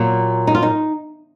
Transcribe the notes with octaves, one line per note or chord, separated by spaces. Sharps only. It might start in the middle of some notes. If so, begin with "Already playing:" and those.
Already playing: A#2 F#3 A#3
D#4
F4
D#4